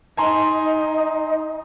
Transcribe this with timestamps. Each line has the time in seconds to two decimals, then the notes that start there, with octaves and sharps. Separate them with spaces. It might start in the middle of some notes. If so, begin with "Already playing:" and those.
0.17 D#4 G#5 A#5 C6